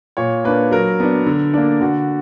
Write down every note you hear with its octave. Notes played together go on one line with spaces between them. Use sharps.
A#2 C#5
A#3 D4 B4
F#3 A#4
B3 D4
D3
A#3 D4
D3 F#4